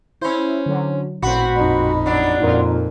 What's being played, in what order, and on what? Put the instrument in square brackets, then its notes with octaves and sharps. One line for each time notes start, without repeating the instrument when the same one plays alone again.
[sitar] C#4 C5 [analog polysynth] E4
[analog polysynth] D3 F#3
[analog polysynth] A1 A#2 B5 [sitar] C4 F#4
[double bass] F2 D#4
[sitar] F#3 D4
[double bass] F2 A#2 [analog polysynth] D#4 F4 A#4